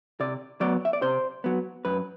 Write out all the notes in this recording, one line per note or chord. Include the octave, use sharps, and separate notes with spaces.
C3 D5
F#3 B3 D5
E5
D5
C3 C5
F#3 B3
F#2 B4